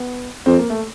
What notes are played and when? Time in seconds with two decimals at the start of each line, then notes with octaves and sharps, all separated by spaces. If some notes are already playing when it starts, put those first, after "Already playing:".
Already playing: B3
0.46 F2 C4
0.58 A#3
0.70 A3